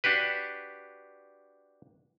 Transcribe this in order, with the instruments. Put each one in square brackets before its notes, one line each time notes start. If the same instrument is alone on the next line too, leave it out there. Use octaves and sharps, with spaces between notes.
[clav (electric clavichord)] D4 F#4 G4 B4